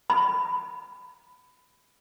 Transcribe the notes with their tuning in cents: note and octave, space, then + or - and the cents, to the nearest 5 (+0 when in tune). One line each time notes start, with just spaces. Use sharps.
B5 +20